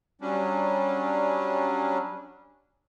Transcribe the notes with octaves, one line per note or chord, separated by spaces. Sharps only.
F#3 G3 C#4 D4